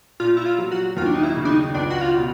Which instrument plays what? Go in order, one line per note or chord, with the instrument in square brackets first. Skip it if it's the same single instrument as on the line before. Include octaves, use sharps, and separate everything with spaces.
[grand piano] A#2 [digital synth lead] F4
[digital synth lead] E4
F4
[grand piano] F#3
[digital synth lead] F#4
[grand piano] D#2 [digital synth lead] F4
[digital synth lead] D4
D#4
E4
[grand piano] C#3
[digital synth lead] D4
D#4
[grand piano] C#2 [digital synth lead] D4
[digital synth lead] F#4
F4
[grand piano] B2